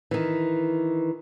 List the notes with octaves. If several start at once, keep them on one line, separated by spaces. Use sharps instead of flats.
D#3 E3